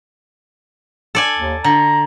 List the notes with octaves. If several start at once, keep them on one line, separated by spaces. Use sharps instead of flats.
A4 D5 G#5
D#2
D3 A#5